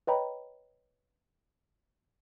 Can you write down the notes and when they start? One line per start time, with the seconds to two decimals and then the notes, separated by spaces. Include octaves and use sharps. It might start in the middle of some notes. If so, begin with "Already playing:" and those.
0.07 B4 C#5 D#5 G5 A#5 B5